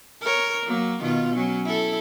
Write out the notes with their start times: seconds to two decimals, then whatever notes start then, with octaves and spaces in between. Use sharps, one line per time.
0.21 A#4 C#5
0.66 F#3 A#3
1.01 B2 D#3 F4
1.34 F#3 C#4
1.65 E4 A4